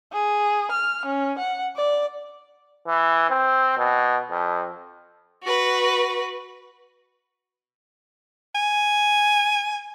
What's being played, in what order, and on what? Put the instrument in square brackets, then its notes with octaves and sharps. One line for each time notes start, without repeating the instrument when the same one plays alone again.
[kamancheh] G#4
F6
C#4
F#5
D5
[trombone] E3
C4
B2
F2
[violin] F#4 B4
[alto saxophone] G#5